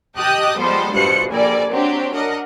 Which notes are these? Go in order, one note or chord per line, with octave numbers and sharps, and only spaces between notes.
G4 D#5 G5 A5 D#6 F#6
F3 G3 G#3 B3 A4 C5
G2 B2 F4 C5 F#6 C#7
A#1 G3 A4 A#4 D5 G#5
F#3 C4 D4 G4
D4 A#4 D#5 F#5